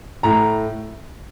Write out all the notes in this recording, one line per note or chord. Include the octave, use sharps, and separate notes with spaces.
A2 A#5